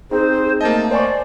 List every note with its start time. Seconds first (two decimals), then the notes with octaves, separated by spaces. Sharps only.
0.11 C4 D#4 G#4 C5
0.61 A3 A#3 D#5 A5
0.91 C5 D5 G#5 C#6